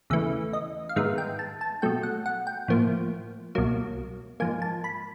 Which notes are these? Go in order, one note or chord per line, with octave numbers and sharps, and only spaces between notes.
E2 C#3 E3 A3 E5
D#5
F5
G#2 D#3 G#3 B3 E5
G5
A5
A5
B2 F#3 A3 G5
F#5
F#5
G5
A2 F3 A#3
C2 B2 F#3 A#3
G#2 F3 A#3 G#5
A5
B5